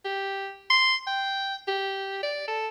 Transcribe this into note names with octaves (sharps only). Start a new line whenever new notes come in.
G4
C6
G5
G4
D5
A4